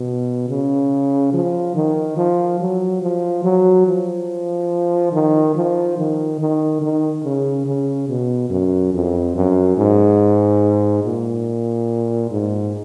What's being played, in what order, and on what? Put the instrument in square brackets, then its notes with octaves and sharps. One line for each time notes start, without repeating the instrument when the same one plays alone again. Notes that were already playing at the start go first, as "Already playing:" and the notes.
Already playing: [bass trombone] B2
C#3
F3
D#3
F3
F#3
F3
F#3
F3
D#3
F3
D#3
D#3
D#3
C#3
C#3
B2
F#2
F2
F#2
G#2
A#2
G#2